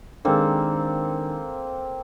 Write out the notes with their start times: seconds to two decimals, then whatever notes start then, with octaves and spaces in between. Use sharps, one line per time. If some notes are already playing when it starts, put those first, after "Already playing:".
0.25 D#3 G#3 A#3 C4 D4 A4